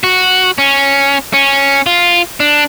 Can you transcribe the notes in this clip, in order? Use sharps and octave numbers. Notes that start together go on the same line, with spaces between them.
F#4
C#4
C#4
F4
D4